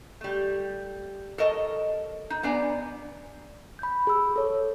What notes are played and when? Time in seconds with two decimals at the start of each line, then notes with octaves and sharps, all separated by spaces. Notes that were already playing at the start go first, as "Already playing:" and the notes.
0.21 G3 A3
1.38 A4 A#4 C#5 D#5 A5
2.30 D#4
2.43 B3 D4 D5 G#5 A#5
3.79 B5 G6
4.07 G#4 E6
4.36 A4 C#5